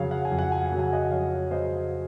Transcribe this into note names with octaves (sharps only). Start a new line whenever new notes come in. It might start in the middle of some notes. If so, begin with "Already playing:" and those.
Already playing: F2 C#3 F#3 C#5 F5
F#5
G#5
F2
F#5
G#5
F#5
C#3 F#3
G#5
D#5 F#5
F2 C#5 F5
C#3 F#3 C5 D#5